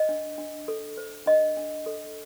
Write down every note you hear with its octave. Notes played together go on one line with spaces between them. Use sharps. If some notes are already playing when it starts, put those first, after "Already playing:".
Already playing: C5 D#5
D4
D4
A4
C5
D4 D#5
D4
A4